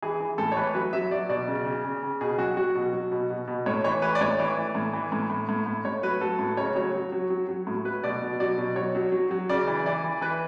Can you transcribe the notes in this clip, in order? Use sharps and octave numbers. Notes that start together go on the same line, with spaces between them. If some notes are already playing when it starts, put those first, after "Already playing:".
E3 G#4
E3
A2 A4
C#5
E3 B4
F#3 B4
F#3 E5
F#3 D5
B2 D5
C#3
C#3
C#3
C#3
B2 G#4
F#3 F#4
F#3 F#4
B2
F#3
B2
B2
B2
A2 C#5
E3 C#5
E3 B4
D5
A2 C#5
E3 D5
E3
A2
E3
A2
A2
A2
A2
A2 C#5
F#3 B4
F#3 A4
A2
C#3 C#5
F#3 C#5
F#3
F#3
F#3
F#3
A2
F#3 B4
B2 D5
B2
F#3 D5
B2
F#3 C#5
F#3
F#3
F#3
C#3 D5
E3
E3 D5
E3
E3 B4